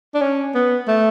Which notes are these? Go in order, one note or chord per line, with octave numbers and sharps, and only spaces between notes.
D4
C#4
B3
A3